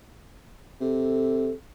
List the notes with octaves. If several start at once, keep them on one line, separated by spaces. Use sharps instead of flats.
C3 A4